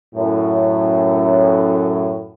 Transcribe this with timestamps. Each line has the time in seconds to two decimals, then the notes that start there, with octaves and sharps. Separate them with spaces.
0.14 F#2 A2